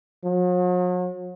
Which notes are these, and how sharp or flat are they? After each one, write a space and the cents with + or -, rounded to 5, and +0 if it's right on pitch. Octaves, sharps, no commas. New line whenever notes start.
F#3 -45